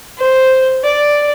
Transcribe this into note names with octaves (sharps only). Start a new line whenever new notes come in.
C5
D5